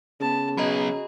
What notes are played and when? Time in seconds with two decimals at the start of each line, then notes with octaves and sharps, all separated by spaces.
0.21 C#3 B3 A5
0.58 F#3 B3 F#4 G#4 D#5 A#5 B5